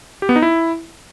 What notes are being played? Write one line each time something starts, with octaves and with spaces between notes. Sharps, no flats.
G4
B3
D#4
E4